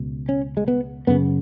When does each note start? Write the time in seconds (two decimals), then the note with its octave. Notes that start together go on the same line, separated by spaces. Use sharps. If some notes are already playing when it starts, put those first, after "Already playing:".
Already playing: C#2 B2
0.29 C#4
0.57 G#3
0.68 B3
1.07 F#2 C#3 B3